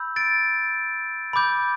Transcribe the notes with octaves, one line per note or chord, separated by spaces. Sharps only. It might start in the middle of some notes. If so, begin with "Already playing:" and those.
Already playing: B5 E6 G6
A6 D7
B5 D6 G6